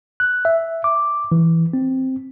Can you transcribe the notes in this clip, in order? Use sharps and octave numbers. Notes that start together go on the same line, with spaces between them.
F#6
E5
D6
E3
C4